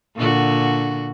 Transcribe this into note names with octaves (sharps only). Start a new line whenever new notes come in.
A#2 D3 F#4